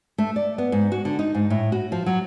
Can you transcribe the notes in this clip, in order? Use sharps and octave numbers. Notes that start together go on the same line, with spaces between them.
A3
D5
B3
G#2
F#4
D3
D#4
G#2
A2
F#4
F3
F#3